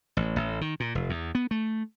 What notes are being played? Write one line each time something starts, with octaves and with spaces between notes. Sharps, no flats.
A1
A1
D#3
A#2
F1
E2
B3
A3